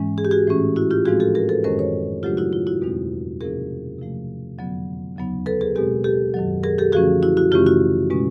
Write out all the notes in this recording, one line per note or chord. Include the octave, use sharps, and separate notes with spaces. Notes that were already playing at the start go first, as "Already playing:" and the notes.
Already playing: G#2 E3 G#3 C#4
G#4
G4
F#4 G#4
A2 E3 A3 C#4
E4 F#4
F4 G4
A2 F3 G#3 C4 D#4 F#4 G#4
G4 A4
G#4 A#4
A4 B4
F#2 D#3 G#3 C#4 A#4 C5
B4 C#5
C#3 F#3 A3 D4 F4 G4
E4 F#4
F4
E4 F#4
E2 B2 G#3 C4 D#4
C3 F3 A#3 C#4 G#4 A#4
C3 F3 A3
F2 D3 F#3 B3
D#2 C#3 F#3 B3 D#4
A4 B4
G#4 A#4
B2 G#3 C4 G4 A4
G4 A4
F#2 D#3 F#3
G#4 A#4
G4 A4
F#2 D3 F3 A3 C#4 F#4 G#4
E4 F#4
E4 F#4
F#2 C#3 E3 A3 C#4 F4 G4
E4 F#4
B2 G#3 C#4